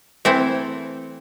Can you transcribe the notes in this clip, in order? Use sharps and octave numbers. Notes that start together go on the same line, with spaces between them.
E3 A3 C4 E4